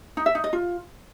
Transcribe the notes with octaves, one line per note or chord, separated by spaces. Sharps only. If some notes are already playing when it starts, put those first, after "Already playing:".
D#4
E5
D#4
D#5
F4